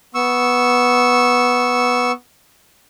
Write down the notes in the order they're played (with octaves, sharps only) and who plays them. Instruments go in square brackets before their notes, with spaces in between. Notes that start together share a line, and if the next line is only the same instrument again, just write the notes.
[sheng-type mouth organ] B3 C#6 E6